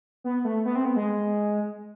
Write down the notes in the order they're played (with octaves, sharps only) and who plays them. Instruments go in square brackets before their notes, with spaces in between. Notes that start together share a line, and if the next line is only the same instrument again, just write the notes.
[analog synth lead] B3
A3
B3
C4
B3
G#3